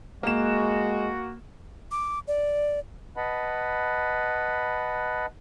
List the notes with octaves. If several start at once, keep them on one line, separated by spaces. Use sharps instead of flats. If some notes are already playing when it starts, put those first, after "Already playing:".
G#3 A#3 F#4 E7
D6
D5
B4 D#5 F#5 A5 B5